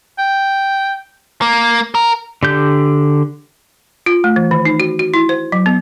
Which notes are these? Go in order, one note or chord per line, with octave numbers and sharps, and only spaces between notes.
G5
A#3
A#4
D3 G4 G6
F4
A3
E3
D#3
D#4
F#4
F#4
E4
C5
F#3
B3